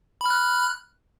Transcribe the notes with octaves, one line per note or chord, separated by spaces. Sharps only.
B5 F6 F#6